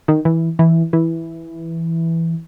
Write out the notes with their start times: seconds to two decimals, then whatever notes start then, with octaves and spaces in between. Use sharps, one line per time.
0.08 D#3
0.25 E3
0.59 E3
0.93 E3